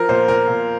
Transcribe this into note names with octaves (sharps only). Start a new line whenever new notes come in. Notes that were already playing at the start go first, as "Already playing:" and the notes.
Already playing: F3 A#4
A#2 C5
A#2 A#4
A#2